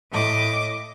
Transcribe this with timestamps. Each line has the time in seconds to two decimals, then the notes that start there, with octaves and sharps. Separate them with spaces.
0.12 A2 D#5 D6